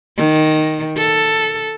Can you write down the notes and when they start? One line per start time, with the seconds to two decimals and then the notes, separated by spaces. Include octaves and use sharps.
0.17 D#3
0.97 A4